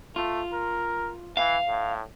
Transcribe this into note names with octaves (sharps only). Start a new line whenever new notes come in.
A3 F4
A#4
E3 F5
A2